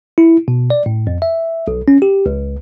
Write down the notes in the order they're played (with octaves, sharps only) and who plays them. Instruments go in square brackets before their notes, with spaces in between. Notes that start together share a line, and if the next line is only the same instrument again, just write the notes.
[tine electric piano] E4
B2
D5
A2
F2
E5
B1
C#4
G4
C#2